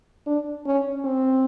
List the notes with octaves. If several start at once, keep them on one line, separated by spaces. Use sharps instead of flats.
D4
C#4
C4